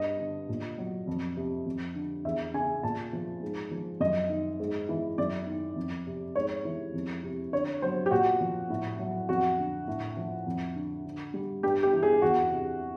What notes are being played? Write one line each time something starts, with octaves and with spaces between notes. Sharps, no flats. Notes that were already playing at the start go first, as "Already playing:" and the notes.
Already playing: G2 D#5
D3
A#2
F#3
F2
C3
F2
D3
E2 E5
C#3 G#5
A#2 A5
F3
G#2
F3
F#2 D#5
D#3
G#2
E3
F#2 D5
D#3
F2
C3
G#2 C#5
E3
F2
C3
D3 C#5
F#3 C5
G4
A#2 F#4
F3
A2
F#3
F2 F#4
D3
A2
F3
F2
D3
D3
G3
G2 G4
G4
E3
G#4
E2 F#4
C3